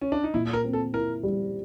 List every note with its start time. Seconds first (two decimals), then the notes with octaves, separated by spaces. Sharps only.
0.02 C#4
0.12 D4
0.24 D#4
0.34 A#2 E4
0.53 A#4
0.64 C4
0.73 A4
0.93 E4 A#4
1.23 G3